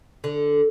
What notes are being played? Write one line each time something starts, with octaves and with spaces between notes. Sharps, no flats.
D3